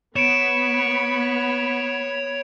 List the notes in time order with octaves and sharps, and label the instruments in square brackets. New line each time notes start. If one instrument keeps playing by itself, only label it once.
[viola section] B3 B5 [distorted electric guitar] C#5 [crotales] D7 E7